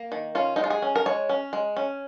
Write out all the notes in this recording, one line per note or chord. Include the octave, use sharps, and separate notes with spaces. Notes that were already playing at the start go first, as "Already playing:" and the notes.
Already playing: A#3
D#3
C#4 F4
G#3 D#4
F4
G#4
C#4
A#4
G#3 C#5
C#4
G#3
C#4